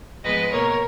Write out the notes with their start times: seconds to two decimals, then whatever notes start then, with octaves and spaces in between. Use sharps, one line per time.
0.23 G#2 F3 G#3 B3 B4 D#5
0.52 B2 A#3 A#4 C#5